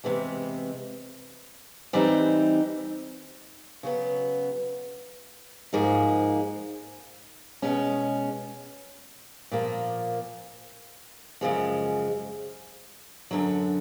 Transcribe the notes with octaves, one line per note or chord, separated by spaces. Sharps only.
E2 C3 E3 G#3
E3 G3 C4 D#4
C#3 F#3 B3
G#2 F3 A#3 D#4 G#4
B2 G#3 C#4
A#2 F3 A#3
F#2 C#3 F3 G#3
F#2 D3 F#3